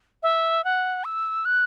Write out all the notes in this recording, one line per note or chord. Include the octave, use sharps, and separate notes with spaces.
E5
F#5
E6
F#6